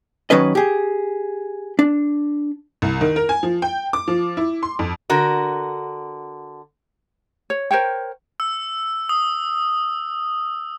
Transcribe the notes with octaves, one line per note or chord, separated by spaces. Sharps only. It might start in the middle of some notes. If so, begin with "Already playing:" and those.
D#3 F#3 C#4 B4 D#5
G4 G#4
D4
C2
D#3
A#4
G#5
F3
G5
D6
F3
E4
C6
F2
D3 F#4 A#4
C#5
A#4 C5 C#5 G5
E6
D#6